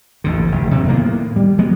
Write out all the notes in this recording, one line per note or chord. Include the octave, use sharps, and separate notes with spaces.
A1 D#2 D3
F1
C3 F#3 A#3
A2 D#3 A#3 B3
G3
F#3 G#3 A#3 B3